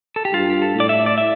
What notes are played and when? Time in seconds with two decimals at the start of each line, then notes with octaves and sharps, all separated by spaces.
0.16 A4
0.25 G4
0.33 G2 F4
0.50 G4
0.62 A4
0.75 A2
0.80 D5
0.89 E5
1.06 D5
1.18 E5